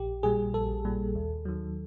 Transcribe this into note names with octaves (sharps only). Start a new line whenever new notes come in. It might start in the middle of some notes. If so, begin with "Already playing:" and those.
Already playing: A#1 G4
A#2 G3 G#4
A#1 A4
A#2 G3
D#2
D#3 F#3